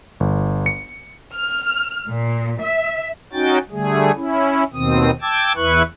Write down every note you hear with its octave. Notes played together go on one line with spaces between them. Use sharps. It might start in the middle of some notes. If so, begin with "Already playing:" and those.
G1
C#7
F6
A#2
E5
C#4 D#4 F#4 G5 A6
D3 G3 A3 G#4
C#4 E4
D#2 B2 D#3 C4 D#6
G5 A5 D6 E6 G#6 A6
E2 E4 B4 C#6 F#6